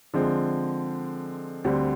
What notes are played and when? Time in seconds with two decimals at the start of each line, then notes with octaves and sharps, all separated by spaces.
0.14 D3 F3 G#3 C4
1.64 D2 D3 G3 C4